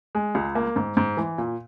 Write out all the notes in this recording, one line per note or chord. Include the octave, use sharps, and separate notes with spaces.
G#3
C#2
A#3
G#2
G#2
E3
A#2